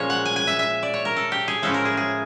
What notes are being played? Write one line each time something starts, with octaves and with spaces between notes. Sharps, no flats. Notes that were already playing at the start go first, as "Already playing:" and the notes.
Already playing: A#2 F3 G#3 C#4 C#5
F#5
G#5
G#5
E5
E5
D5
C#5
A#4
A4
G4
G#4
A2 F3 G#3 C#4 E4 A4
A#4
G#4
G#4